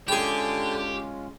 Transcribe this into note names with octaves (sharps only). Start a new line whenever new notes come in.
D3 G#3 C#4 F4 G4 G#4 G5